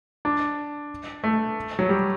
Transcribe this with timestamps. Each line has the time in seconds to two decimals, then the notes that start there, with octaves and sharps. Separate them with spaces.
0.25 D4
1.24 A3
1.79 F#3
1.89 G3